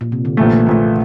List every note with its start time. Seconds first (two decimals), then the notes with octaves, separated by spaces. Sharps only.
0.01 A#2
0.12 C3
0.25 D3
0.37 A#1 A#2 E3 A3
0.67 A#1 A#2 A3 A#3